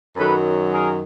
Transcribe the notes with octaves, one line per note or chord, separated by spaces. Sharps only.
F#2 D#3 F#3 A4 B4
G#4 A#4